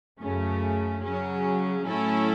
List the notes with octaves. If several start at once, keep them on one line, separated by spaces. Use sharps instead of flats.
F#2 C#3 A3 C#4
C#3 F#3 C#4
A2 F#3 C#4 E4 A4